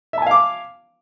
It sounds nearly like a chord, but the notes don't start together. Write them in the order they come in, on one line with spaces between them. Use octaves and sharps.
E5 A5 G#5 F5 D6